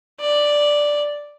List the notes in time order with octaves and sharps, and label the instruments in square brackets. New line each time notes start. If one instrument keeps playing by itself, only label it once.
[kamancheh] D5